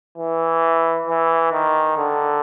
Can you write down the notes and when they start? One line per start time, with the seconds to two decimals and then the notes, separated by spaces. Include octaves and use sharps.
0.18 E3
1.08 E3
1.52 D#3
1.97 D3